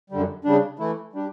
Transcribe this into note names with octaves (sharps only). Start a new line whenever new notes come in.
F#2 D3 G3
C#3 G3 D4
E3 A3 E4
G3 D4 G4